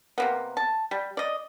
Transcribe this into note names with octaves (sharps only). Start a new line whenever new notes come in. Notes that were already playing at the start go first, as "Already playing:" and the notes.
C3 A#3 B3
A5
G3
D5 D#5